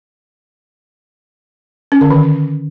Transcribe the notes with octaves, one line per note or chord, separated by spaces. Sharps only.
C#4
D3
D#3